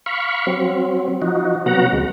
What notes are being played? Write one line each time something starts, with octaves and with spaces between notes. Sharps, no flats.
F5 B5 C#6
F#3 C4
F3 D#4 F#4
C3 F#3 B3 F#4 F#5 A#5
D2 G#3